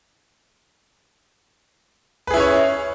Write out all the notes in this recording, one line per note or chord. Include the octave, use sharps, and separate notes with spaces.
C#4 E4 G#4 B4 C#5